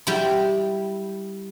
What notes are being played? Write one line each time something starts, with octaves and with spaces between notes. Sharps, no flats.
G3 E4